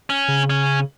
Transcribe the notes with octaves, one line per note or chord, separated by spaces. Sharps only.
C#4
C#3
C#4